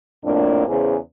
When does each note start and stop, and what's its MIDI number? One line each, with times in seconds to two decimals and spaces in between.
0.24 0.66 41
0.24 0.66 45
0.24 0.66 58
0.24 0.66 62
0.68 0.97 40
0.68 0.97 49
0.68 0.97 68
0.68 0.97 72